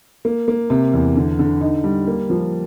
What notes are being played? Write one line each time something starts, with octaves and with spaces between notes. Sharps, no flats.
A#3
A#3
C3
E2
D3
D3
D#4
G3
A#3
F3